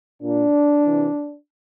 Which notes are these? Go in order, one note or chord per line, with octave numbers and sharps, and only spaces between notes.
A#2 D4
C3 E3